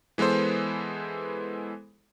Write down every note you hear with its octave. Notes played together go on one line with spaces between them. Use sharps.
E3 G#3 B3 A4 C5